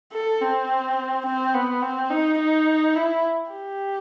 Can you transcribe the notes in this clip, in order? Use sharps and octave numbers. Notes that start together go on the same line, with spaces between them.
A4
C4
C4
B3
C4
D#4
D#4
E4
G4